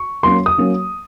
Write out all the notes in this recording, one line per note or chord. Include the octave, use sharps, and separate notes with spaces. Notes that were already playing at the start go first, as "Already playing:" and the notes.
Already playing: C#6
F#3 A#3 C#4 C6
D#6
F#3 A#3 C#4